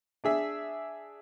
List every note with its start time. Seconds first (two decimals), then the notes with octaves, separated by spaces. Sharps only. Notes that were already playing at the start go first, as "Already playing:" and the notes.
0.24 D4 G#4 E5